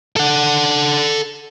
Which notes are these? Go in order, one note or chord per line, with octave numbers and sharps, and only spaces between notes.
A4 F#5